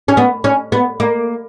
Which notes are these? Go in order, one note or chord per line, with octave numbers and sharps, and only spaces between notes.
C#4
B3
C#4
B3
A#3